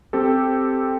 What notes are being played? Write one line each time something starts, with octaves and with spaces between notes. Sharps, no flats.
C4 G4 A4